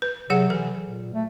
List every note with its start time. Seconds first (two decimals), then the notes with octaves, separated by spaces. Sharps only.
0.02 B4
0.30 C3 F#3 G#4 F#5
0.50 E3 A4
0.84 A#2
1.14 A3